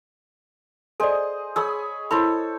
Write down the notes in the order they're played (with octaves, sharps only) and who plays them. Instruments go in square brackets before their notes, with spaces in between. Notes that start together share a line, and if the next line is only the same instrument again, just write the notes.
[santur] G#4 C5 D#5 [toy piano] A4 D5
[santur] G#4 C#5 B5 [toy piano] E6
[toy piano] E4 B5 [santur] A4 C5 C#5